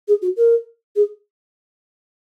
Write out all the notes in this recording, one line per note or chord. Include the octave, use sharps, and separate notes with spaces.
G#4
F#4
A#4
G#4